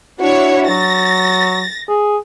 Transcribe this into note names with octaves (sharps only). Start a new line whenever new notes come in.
D4 E4 F#4 C#5
F#3 A6 A#6
G#4